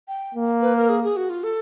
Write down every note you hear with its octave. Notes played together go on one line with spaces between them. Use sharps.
G5
A#3
B4
A#4
G#4
G#4
F#4
F4
A4